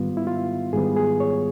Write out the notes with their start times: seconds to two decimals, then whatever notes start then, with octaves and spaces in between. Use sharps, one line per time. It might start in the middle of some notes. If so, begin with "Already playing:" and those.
Already playing: G#2 D#3 G3 B3 F4
0.17 E4
0.27 F4
0.73 G#2 D#3 G3 B3 G#4
0.96 G#4
1.20 C#5